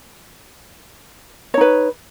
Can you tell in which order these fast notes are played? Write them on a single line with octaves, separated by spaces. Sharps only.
C#5 D#4 B4